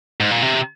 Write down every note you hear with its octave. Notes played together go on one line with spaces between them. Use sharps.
G#2
A#2
C3